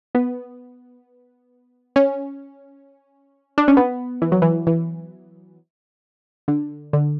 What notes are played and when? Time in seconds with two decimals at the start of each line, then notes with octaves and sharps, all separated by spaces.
0.15 B3
1.96 C#4
3.58 D4
3.68 C#4
3.77 B3
4.22 E3
4.32 F#3
4.42 E3
4.67 E3
6.48 D3
6.93 D3